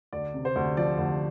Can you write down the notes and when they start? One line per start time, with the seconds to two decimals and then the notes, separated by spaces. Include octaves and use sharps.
0.13 D2 D5
0.34 C3
0.45 C5
0.56 D2
0.77 F3 D5
0.99 D2